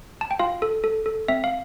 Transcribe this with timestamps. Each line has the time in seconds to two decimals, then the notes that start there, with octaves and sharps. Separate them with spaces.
0.21 A5
0.31 G5
0.39 F4 F5
0.62 A4
0.84 A4
1.06 A4
1.28 C4 E5
1.44 F5